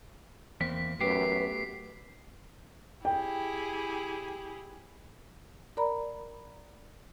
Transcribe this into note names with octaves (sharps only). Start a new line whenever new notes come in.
E2 A#3 C4 B6
F#2 A3 B3 G4 B4 C7
E4 G4 G#4 G5
A#4 D5 A#5 B5